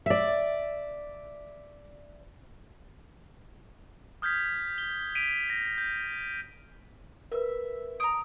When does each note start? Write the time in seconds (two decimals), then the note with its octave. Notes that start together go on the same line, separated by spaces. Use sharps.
0.06 D5 E5
4.22 D#6 F6 G6 G#6 B6
4.78 G7
5.15 B6 D7 D#7 F7
5.50 A#6
5.78 G6
7.32 A#4 B4 E5
8.00 A#5 D#6 D7